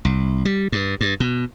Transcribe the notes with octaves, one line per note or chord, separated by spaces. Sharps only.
C2
G3
G2
G2
B2